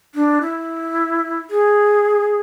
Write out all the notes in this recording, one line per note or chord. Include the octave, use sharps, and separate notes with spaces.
D4
E4
G#4